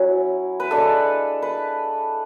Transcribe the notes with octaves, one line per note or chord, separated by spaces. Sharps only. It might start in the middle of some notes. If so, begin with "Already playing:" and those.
Already playing: F#3 C#4 E4
B4
G#3 D4 A4
B4